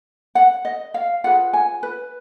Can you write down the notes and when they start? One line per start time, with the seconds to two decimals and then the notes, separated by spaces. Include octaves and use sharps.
0.35 F#5
0.65 D#5
0.94 F5
1.24 F4 G#4 B4 F#5
1.53 G#5
1.83 B4